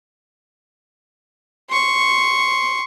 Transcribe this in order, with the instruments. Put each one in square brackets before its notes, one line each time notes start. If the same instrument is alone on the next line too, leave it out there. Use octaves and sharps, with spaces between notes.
[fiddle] C6 C#6